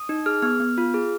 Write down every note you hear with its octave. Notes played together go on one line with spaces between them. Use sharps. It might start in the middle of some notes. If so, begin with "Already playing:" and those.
Already playing: D#6
D#4
G#4 F6
B3 F6
B3
F4
G#4